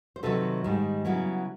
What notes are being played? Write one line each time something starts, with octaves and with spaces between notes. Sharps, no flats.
C5
C3 D#3 F#3 A4 B4
G#2 D#3 G3
C#3 F#3 B3 E4